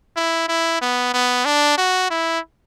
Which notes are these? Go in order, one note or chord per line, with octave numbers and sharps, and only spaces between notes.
E4
E4
B3
B3
D4
F#4
E4